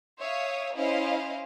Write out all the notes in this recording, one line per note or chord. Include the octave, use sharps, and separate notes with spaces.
C#5 E5 F5 D#6
C#4 E4 C5 D#5 F5